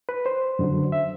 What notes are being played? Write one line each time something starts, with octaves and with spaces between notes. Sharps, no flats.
B4
C5
F#2 D3 F#3
E5